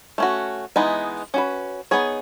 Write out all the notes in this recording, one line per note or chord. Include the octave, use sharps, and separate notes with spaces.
A3 C#4 F#4
E3 G#3 B3 D#4
C#4 F#4 B4
B3 D#4 G#4 C#5